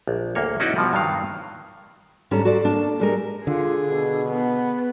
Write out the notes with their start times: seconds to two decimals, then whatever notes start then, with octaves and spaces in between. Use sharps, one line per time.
0.07 A#1
0.35 D2 A#3 C#5
0.60 C#4 D#4 E4 F#4 D5 D#5
0.76 B2 F3 G3
0.93 G2 D#3 F#3 F5
2.31 D2 G#2 G3 C#4 A4 A#5
2.45 F#4 A4 C5 D5
2.65 A#3 D4 A5
3.00 G3 G#3 A#4
3.47 D3 F4 G#4
3.89 B2
4.29 B3